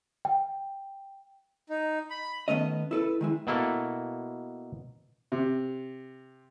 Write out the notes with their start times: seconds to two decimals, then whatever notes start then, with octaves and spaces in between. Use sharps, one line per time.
0.25 G5
1.69 D#4
2.10 B5
2.48 D#3 G#3 A3 B3 C#4 D#5
2.91 E4 A4 B4
3.21 D#3 G#3 E4
3.47 B2 A#3 E4 A4
5.32 C3